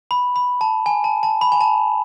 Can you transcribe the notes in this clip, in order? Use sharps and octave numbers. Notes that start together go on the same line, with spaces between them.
B5
B5
A5
G#5
A5
A5
B5
G#5
A5